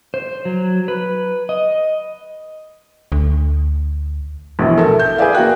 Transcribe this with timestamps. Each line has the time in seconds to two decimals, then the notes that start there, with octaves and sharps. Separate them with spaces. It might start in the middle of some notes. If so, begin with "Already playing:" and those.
0.14 C5
0.45 F#3
0.88 B4
1.49 D#5
3.12 D2
4.59 A#1 B2 E3
4.77 A4 A#4 E5
4.99 G6
5.18 G#4 B4 D5 E5 F5
5.35 A#3 F#4 G5 F#6